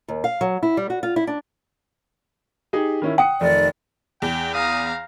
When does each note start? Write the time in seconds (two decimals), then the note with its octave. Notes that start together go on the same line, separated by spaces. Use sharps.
0.08 D#2
0.24 F5
0.41 F#3
0.63 E4
0.77 G3
0.90 F#4
1.03 F4
1.16 E4
1.27 D4
2.73 D#4 G4 G#4
3.02 D#3 C#4 E4
3.18 F#5 G5 D#6 C#7
3.41 F1 D#3 D5
4.22 E2 G5
4.54 F5 A#5 D#6